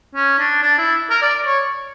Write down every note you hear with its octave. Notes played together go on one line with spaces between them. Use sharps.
C#4
D4
D4
E4
A#4
D5
C#5